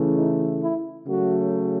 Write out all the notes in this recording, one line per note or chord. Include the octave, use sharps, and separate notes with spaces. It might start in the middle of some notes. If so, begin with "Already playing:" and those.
Already playing: C#3 E3 A3
D#4
E4
C#3 F#3 A3 F#4